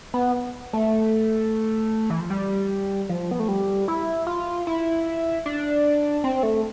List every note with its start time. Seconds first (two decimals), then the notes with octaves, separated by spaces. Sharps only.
0.14 B3
0.73 A3
2.10 E3
2.20 F3
2.30 G3
3.09 F3
3.31 B3
3.40 A3
3.48 G3
3.88 E4
4.27 F4
4.67 E4
5.46 D4
6.24 C4
6.43 A3